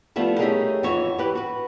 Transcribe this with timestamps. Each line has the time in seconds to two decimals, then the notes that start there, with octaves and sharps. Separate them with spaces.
0.16 F3 G3 A3 B3 E4 F4
0.39 A3 C#4 D#4 G4 G#4 A#4
0.83 F2 E3 F#4 C#5
1.18 E3 G4 B4
1.35 F#4 B4